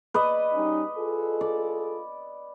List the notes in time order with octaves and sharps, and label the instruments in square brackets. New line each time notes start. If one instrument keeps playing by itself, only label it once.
[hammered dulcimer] B4 D5 D#5
[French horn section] G3 C#4 D#4
F4 G#4 A4
[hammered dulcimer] D5